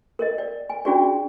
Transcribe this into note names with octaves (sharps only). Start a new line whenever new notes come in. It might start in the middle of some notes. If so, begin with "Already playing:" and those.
A#4 C#5 D#5
D5
G#5
C#4 D4 F4 F#4 G#4 D5